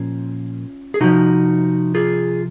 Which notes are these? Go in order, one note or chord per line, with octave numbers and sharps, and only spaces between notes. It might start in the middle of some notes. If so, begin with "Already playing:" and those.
Already playing: A#2 F3 C#4 F4
G#4
C3 F3 D#4 F#4
F4 G#4